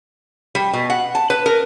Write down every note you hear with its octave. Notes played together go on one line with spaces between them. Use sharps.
G3
B2
F#5
A5
B4
A#4